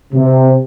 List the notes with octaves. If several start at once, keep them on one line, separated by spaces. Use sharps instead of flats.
C3